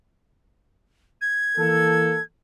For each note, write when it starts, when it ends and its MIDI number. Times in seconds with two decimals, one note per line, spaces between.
1.22 2.22 92
1.57 2.19 52
1.57 2.19 58
1.57 2.19 69